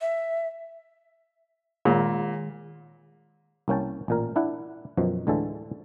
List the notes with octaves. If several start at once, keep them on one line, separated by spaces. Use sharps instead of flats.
E5
A#2 D#3 G#3
C2 A#3 C#4 G5 A5
A1 A#2 A#4
D4 E4 F#5
F#2 B2 D#3 F3
D2 A2 D3 E3 G#3 A4